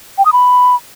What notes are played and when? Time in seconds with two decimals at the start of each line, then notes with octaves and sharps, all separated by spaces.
0.18 G5
0.25 D#6
0.33 B5